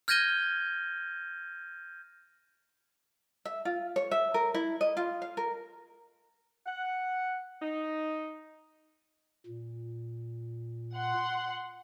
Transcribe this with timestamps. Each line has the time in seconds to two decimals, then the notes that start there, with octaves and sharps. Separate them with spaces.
0.08 F6 G6 G#6 A#6 D#7 G7
3.45 E5
3.65 F4
3.96 C#5
4.11 E5
4.34 A#4
4.54 E4
4.81 D#5
4.97 F4
5.22 F5
5.37 A#4
6.66 F#5
7.62 D#4
9.46 A#2
10.96 F#5 C6